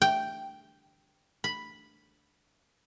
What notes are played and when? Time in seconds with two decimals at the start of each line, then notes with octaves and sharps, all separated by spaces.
0.02 G5
1.44 B5